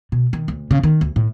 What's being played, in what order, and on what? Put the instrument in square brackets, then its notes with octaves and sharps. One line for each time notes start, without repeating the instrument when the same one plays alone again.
[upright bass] B2
D#3
D2
C#3
D#3
D2
A2